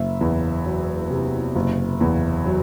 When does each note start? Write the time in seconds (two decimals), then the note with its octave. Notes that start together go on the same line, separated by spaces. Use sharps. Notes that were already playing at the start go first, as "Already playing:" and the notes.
Already playing: F#1 E5
0.21 E2
0.65 F#3
1.10 C3
1.55 F#1
2.01 E2
2.45 F#3